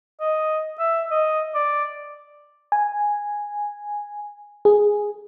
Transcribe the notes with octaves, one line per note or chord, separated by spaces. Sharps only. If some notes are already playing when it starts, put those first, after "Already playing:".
D#5
E5
D#5
D5
G#5
G#4